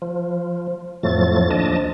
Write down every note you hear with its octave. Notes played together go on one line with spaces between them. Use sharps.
F3
F2 A2 F3 F#3 A3 A6
D#2 F3 D4 D#5 A5